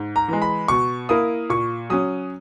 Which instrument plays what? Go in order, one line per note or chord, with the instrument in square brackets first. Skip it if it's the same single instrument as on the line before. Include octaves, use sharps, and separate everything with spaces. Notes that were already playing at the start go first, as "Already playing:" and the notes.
Already playing: [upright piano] G#2
[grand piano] A#5
[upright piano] E3 G#3
[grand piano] B5
[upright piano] B2 [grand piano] C#6
[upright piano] A#3 E4 A#4 [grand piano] D#6
[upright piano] A#2 [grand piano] C#6
[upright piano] F#3 C#4 [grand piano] D#6